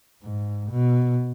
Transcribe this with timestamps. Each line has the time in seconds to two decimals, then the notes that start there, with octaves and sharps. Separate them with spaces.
0.23 G#2
0.71 B2